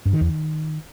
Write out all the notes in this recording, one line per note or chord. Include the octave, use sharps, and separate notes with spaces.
G2
D#3
E2
D#3